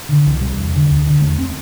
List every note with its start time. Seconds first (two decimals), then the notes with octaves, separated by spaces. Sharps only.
0.09 D3
0.26 C2 E3
0.41 C3 G3
0.58 E2
0.74 D3
0.90 D2
1.06 D3
1.22 E2 A3
1.38 C4